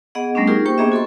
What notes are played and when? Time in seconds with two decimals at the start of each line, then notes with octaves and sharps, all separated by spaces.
0.15 B3 G#4 D#5 F#5
0.35 G3 A3 B3 C#4 D4
0.47 D#4 F4 G4 G#4 A#4
0.65 A#3 G4 C5 G5 C#6
0.78 A#3 B3 D4 G#4 D#5 E5
0.92 F#4 A4 C6 C#6